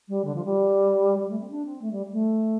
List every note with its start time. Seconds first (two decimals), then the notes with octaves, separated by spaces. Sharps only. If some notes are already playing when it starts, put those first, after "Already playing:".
0.08 G3
0.25 D3
0.35 F3
0.45 G3
1.19 G3
1.30 A3
1.40 C4
1.50 D4
1.65 C4
1.82 A3
1.91 G3
2.12 A3